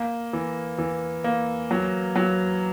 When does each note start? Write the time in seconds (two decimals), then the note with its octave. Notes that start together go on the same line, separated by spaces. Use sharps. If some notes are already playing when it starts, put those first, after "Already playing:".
Already playing: A#3
0.33 E3
0.78 E3
1.24 A#3
1.71 F#3
2.16 F#3